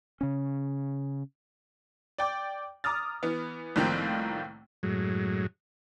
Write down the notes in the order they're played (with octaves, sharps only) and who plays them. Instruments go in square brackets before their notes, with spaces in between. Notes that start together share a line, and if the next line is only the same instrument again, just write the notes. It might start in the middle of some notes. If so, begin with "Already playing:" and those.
[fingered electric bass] C#3 C#4
[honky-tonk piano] D5 G5 D6
A#5 D6 D#6 F6 A6
E3 B3
C2 A2 D#3 F3 A#3 C4
[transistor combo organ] F#2 A2 F#3 G#3